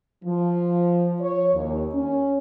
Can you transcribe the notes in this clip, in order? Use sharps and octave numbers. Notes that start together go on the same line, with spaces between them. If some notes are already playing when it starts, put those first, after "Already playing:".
F3
C#5
D#2
C#4